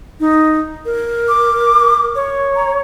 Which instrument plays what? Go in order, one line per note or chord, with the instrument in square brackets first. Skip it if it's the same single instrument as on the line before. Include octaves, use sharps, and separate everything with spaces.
[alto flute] D#4
A#4
[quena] D6
C#5
[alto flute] A#5